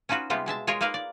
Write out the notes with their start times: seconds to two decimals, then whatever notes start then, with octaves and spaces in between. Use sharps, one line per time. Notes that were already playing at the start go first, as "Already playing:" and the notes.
0.09 C#4 D#4 F4 F#4 B4
0.30 C3 G3 G#3 B3 F4 G4
0.46 B2 G#3 E5 A5
0.67 G#3 F4 G#4 A#4 C#5
0.81 A#3 D#4 A#4 B4 F5
0.94 D5